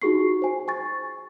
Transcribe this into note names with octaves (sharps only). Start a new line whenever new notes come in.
D#4 F4 F#4 G#4 C#6 C7
C5 G#5
G#5 C#6 A6